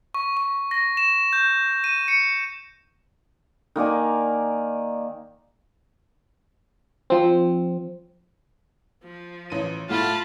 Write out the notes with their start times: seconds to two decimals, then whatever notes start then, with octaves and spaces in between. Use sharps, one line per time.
0.14 C#6
0.37 C#6
0.71 A#6
0.97 E7
1.33 G6
1.84 D#7
2.08 C#7
3.76 D#3 A#3 D5 G#5
7.10 F3 C4
9.03 F3
9.50 A1 D#7
9.89 A2 A3 F4 F#5 A5 B5